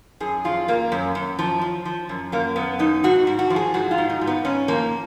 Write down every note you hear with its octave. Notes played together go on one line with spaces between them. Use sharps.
F#2 G#4
F3 F4
F#2 A#3
F#2
F#2
F3
F3
F3
F#2
F#2 A#3
F#2 B3
F#2 D#4
G#2 F#4
G#2
F#4
F3
G#4
G#2 F#4
F4
G#2
D#4
G#2
B3
G#2 C#4
F3 A#3